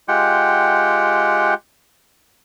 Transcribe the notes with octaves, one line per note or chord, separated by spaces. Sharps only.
G#3 F4 G4 F#5 G5